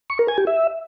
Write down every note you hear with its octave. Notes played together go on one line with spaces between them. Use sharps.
C#6
A#4
G#5
G4
E5